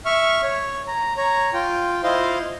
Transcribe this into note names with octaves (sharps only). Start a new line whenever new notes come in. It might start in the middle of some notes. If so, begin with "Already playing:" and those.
E5 C#6 F6
C#5
A#5
C#5 A#5
F4 G5
E4 F4 C5 D#5 F5 C6